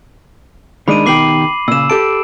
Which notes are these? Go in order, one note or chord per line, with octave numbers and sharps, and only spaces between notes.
D#3 G#3 D4 B5 D#7
B2 D#3 G4 D6 C7 F#7
A#2 C#3 E6 E7
G4 A4 A5 D7